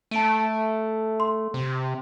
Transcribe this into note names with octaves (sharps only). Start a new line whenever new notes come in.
A3 A5 D7 D#7
C6
C3